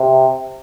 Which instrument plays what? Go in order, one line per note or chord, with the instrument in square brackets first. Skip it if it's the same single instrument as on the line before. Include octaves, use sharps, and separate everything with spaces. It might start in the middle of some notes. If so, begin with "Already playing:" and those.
Already playing: [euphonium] C3